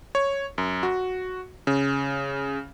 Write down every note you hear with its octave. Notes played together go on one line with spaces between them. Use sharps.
C#5
F#2
F#4
C#3